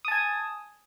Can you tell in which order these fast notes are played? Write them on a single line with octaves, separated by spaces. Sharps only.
D#6 A5 G#5